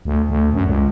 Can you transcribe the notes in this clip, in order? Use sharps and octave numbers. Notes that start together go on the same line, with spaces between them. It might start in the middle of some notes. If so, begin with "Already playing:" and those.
D2
D2
F#2
C#2